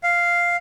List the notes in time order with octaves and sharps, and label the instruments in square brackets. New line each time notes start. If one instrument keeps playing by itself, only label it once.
[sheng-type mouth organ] F5